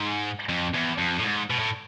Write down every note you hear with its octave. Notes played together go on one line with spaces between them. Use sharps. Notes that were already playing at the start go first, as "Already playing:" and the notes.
Already playing: G#2
F2
E2
F2
A2
G#2
B2
A2